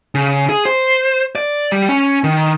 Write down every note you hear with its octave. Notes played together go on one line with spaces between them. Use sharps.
C#3
G#4
C5
D5
G3
C#4
D#3